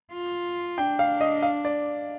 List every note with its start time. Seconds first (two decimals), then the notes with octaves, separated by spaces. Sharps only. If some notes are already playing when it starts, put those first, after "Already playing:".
0.13 F4
0.78 D4 G5
0.99 F5
1.21 D#5
1.43 F5
1.65 D5